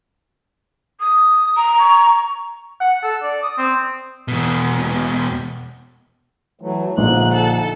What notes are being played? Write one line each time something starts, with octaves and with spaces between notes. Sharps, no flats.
D#6
A#5
C#6
F#5
A4
D5
D#6
C4
E2 B2
E3 F#3 A3
A#1 D3 F3 D#4 F#6
A4